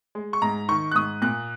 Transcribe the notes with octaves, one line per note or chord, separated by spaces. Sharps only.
G#3
C#6
G#2 A#5
D#3 C#6
F#6
G#2 D#6
A#2 F#6